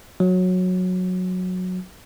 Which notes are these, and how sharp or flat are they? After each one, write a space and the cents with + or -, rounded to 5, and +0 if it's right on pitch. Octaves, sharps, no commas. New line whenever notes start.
F#3 -15